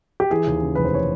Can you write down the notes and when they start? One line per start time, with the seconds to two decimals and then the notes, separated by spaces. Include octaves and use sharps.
0.20 G4
0.30 E3 G#4
0.47 D#2
0.62 C#3
0.75 F1 B4
0.85 C5
0.94 E3 C#5